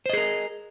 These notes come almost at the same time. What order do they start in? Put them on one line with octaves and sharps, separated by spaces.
C5 D#5 G#4 A#4